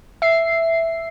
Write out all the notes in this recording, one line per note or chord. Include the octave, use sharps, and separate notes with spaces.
E5 C7